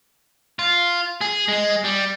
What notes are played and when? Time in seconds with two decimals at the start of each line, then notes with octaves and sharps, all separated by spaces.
0.59 F4
1.21 G#4
1.48 G#3
1.84 G3